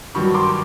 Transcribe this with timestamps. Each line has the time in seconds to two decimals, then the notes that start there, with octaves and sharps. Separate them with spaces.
0.15 G2 D#3 F#3 B5 C#6
0.34 C6 D6